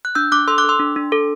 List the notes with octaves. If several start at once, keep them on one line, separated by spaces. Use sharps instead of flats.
F#6
D4 E6 G6
D4 D6 F#6
A4 C6 E6
D6 F#6
A4 C6 E6
D4
D4
A4